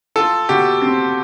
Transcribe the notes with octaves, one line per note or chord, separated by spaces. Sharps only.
F4 A4
B2 G4
C4